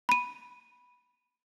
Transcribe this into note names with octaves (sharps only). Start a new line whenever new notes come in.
B5 D#7